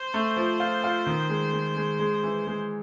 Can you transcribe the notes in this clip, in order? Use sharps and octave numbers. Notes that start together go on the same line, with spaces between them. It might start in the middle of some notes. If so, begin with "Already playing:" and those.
Already playing: C5
A3
F3
F4
F4
D#3
G#3
G#3
G#3
G#3
E3
G#3